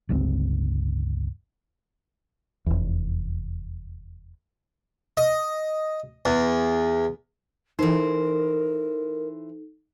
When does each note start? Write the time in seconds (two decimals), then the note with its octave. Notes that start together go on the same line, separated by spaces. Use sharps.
0.09 G1 C#2 D3 C4
2.66 F1 E2
5.17 D#5
6.25 E2
7.79 E3 D#4 A4 A#4 C5